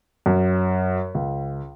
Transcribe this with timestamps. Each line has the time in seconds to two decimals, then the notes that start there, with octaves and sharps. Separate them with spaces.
0.26 F#2
1.15 C#2